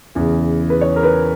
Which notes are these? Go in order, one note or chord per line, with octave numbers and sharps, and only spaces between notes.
E2 C#3 E3
B4
C#5
A#4
B4